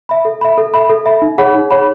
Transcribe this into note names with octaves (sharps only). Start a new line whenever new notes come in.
E5 B5
A4
E5 B5
A4
E5 B5
A4
E5 B5
D#4
G#4 C#5 F#5 B5
D#4
G#4 C#5 F#5 B5